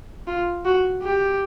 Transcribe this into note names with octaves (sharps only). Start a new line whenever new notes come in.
F4
F#4
G4